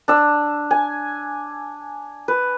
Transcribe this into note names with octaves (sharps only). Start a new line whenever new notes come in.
D4 E6
G#5
B4